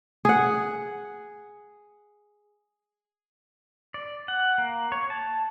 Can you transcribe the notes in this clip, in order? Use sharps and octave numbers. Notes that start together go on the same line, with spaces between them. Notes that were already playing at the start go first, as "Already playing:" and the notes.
G#4 F#5
D5
F#5
A#3
C#5
A5